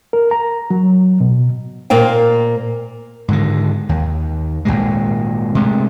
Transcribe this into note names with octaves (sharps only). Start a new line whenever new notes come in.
A#4
A#5
F#3
B2
A#2 A#3 C5 G5
G#2 D3 D#3
D#2
G#1 D#2 A#2 G#3
C3 G#3 A3